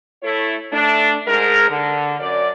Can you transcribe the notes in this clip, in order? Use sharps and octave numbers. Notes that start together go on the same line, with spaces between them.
A3 E4 A4 C#5
A3 D4
G#2 G#3 A#4
D3
F#2 D5